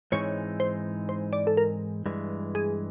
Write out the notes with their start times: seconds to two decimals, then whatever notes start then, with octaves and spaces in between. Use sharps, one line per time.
0.12 G#2 E3 G#3 C4 D#4 C#5
0.60 C5
1.09 C5
1.33 D5
1.47 A4
1.57 A#4
2.06 G2 E3 G#3
2.55 G#4